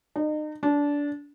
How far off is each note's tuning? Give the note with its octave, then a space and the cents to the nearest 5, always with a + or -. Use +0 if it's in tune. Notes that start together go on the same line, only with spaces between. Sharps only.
D#4 -35
D4 -20